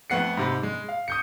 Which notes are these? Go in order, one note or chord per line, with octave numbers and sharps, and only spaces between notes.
F2 A3 B3 F#5 C7 C#7
G#2 C3 B5
G#3
F5
D#6 G6 C#7